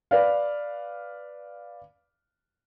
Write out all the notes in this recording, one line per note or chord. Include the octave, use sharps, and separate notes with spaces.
B4 D5 F5